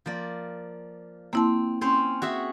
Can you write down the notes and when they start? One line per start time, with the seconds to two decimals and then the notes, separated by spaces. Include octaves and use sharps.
0.06 F3 A#3 D5
1.33 A#3 C4 E4 A5
1.81 C4 C#4 C5
2.22 F#4 G#4 E5